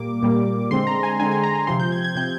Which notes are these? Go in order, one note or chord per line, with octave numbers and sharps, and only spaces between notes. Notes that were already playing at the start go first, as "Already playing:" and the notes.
Already playing: A#2 G3 A#3 D6
A#2 G3 A#3
D3 G#3 C4 C6
A#5
G#5
D3 G#3 C4 G#5
G#5
A#5
G#5
C3 F3 C4 C6
G6
G#6
G#6
C3 F3 C4 G6